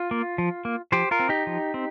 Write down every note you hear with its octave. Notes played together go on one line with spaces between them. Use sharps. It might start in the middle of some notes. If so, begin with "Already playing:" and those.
Already playing: F4
A#3
F3
A#3
F3 G4 C5
F4 A#4
C4
D#4 G4
F3
C4